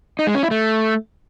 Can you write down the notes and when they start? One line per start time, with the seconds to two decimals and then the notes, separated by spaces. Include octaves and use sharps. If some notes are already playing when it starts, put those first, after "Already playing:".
0.19 D#4
0.27 G#3
0.35 C#4
0.43 E4
0.51 A3